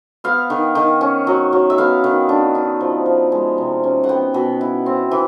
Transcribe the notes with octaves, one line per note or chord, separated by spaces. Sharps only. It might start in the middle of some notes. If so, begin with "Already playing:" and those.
B3 F5
D#3
D#3
C#4
F#3
F#3
E5
B3 F5
D#3
D4
D#4
F3
F3
G#3
C3
C#4
F#5
B3 G5
B2
E4
C4
E3